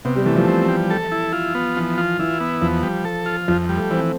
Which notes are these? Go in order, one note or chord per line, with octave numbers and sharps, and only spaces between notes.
C3 B3
G3
E3 A3
F3
C4
G3
A4
E4
F4
B3
E3 F3
F4
E3 E4
B3
E2 F3
G3
A4
F4
F2 F3
G3
A3
E3 C4